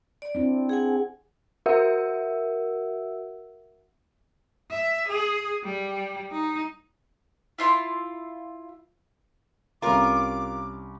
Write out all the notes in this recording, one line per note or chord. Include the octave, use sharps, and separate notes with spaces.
D5
C4 D4 E4
G#4 F#5 G#5
F#4 A#4 E5 F#5 E6
E5
G#4
G3
D#4
E4 F4 C6
C2 C#4 F4 A#4 A#5 D6